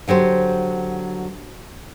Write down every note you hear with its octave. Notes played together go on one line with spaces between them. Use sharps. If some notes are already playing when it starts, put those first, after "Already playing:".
D3 F#3 G4 C5